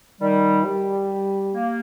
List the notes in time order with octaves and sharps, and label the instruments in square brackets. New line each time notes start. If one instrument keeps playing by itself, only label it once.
[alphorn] D#3 [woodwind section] G3
[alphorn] G3
[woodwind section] A#3